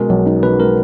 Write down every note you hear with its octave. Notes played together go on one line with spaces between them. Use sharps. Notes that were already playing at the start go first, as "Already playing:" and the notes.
Already playing: B2 G#3 A#4
B1
D#4
B2 B4
G#3 A#4